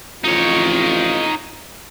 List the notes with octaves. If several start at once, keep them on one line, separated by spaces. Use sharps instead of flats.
A1 F2 D#4 F4 C#5